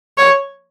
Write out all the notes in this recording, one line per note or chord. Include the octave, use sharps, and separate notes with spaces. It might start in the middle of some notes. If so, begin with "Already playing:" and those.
C#5